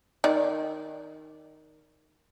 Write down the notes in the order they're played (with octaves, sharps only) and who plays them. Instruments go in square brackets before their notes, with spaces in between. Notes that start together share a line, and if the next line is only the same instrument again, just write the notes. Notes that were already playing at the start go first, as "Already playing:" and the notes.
[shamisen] D#3 D5